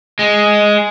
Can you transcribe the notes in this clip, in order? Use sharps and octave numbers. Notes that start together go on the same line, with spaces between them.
G#3